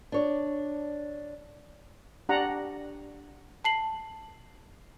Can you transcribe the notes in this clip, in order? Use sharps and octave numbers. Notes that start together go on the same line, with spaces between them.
D4 C#5 D5
D4 G4 D5 F#5 A#5
A5 C7 F#7